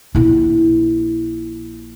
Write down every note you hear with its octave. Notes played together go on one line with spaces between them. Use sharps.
A#1 E4